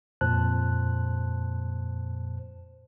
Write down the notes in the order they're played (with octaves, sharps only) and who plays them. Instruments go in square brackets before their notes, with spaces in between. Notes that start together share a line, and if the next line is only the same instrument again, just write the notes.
[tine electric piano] F2 A#2 C5 A5 F#6